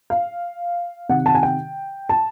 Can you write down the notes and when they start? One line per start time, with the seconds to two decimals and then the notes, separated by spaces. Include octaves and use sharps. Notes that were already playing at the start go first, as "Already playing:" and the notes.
0.10 F5
1.09 C3 D#3 F#5
1.26 A5
1.35 G#5
1.43 G5
2.09 A5